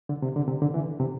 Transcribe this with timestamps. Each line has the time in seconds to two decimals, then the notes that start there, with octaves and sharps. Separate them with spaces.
0.09 D3
0.22 C3
0.36 D3
0.48 C3
0.62 D3
0.74 E3
1.00 C3